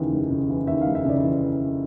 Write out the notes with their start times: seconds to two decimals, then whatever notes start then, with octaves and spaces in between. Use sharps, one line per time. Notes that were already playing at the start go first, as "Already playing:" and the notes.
Already playing: D#2 C#3 E3
0.12 F1
0.30 C#3
0.49 E3
0.67 D#2 E5
0.82 F5
0.86 F1
0.95 E5
1.05 C#3 D5
1.24 E3